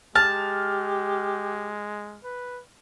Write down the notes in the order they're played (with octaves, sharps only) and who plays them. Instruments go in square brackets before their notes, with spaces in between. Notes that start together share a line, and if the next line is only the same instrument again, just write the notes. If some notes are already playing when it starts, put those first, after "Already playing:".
[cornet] G#3 [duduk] G4 [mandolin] A5 [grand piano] F6
[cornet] B4